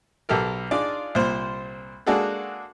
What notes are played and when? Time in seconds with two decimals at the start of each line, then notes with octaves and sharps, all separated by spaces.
0.29 B1 G4 A4 A#4
0.71 D4 D#4 F4 G#4 D5
1.15 C2 A#2 C5
2.07 G#3 A#3 D4 F#4 G#4 A4